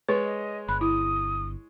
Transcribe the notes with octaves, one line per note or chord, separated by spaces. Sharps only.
G#3 B4 C#5
D#5
G1 B5 F#6
E4 D#6